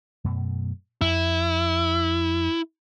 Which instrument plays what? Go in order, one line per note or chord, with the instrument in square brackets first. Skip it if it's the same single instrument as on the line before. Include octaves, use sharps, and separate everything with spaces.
[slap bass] F#2 B2 A3
[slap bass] F2 [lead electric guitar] E4